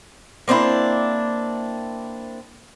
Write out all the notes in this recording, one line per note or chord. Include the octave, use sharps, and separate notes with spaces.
A#3 C4 D4 E4